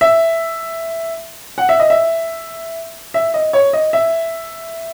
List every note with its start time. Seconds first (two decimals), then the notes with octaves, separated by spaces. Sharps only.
0.01 E5
1.58 F#5
1.69 E5
1.79 D#5
1.90 E5
3.14 E5
3.34 D#5
3.53 C#5
3.73 D#5
3.93 E5